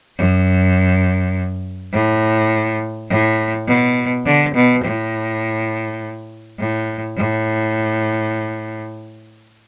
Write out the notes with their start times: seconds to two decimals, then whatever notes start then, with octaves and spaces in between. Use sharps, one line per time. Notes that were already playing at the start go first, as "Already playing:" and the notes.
0.18 F#2
1.93 A2
3.09 A2
3.67 B2
4.25 D3
4.55 B2
4.84 A2
6.59 A2
7.17 A2